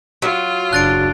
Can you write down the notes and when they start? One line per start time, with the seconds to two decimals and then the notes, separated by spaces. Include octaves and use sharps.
0.22 F#3 F4
0.73 F#1 D4 F#6 A6 D7